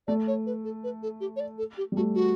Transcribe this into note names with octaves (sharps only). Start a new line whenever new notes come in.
A3 D5
C#5
B4
A4
B4
A4
G4
C#5
D5
A4
G4
G3
A3 F#4
F#4